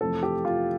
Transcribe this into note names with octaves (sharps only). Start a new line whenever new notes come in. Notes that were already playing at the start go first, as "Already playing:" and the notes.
F2 C3 E3 A3 A4
G4
F4